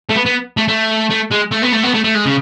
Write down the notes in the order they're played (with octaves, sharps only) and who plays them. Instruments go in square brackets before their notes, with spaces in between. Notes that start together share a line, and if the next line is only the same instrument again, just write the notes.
[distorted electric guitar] A3
B3
B3
A3
A3
A3
G#3
A3
B3
A3
B3
A3
A3
G#3
C#3